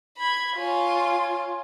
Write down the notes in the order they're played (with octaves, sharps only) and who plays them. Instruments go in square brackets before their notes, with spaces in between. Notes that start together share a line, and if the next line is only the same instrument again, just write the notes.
[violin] B5 G#6
[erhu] F4 [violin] C#5 G#5